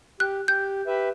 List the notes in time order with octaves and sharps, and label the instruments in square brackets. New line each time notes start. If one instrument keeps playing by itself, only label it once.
[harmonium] G4 [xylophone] F#6
[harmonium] G4 [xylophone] G6
[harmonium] G4 B4 E5